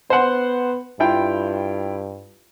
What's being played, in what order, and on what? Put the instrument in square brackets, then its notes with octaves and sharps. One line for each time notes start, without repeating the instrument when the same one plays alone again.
[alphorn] B3 [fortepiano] C5 F#5
[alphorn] G2 [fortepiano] E4 F4 G5